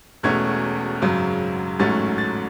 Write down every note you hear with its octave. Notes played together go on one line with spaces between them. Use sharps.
E1 E2 B2 A3 C#4 G#6
G#1 F#2 C#3 F#3
A1 G#2 F#3 A3 C#4 A6
A6